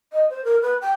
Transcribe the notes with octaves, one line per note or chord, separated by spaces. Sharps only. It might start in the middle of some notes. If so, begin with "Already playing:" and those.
D#5
C5
A#4
B4
G5